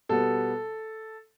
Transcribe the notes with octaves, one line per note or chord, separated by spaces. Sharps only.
B2 G3 B3 A4